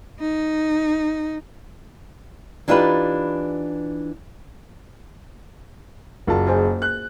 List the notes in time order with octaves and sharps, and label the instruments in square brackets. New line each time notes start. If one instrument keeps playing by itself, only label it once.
[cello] D#4
[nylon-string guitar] E3 D4 D#4 F4 G4 B4
[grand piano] F#1 A5 [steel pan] A#3 F4 F#4
[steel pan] G#4 C5
[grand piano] F#6